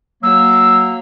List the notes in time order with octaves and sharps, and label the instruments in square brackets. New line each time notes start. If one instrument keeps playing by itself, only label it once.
[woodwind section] F#3 A#3 [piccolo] E6